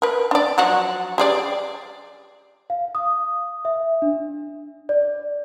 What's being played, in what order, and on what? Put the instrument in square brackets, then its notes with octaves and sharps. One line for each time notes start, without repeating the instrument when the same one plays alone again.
[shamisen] A#4 B4
D4 D5
F3 F#3 F#4
G4 G#4 D5
[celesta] F5
D#6
E5
D4
D5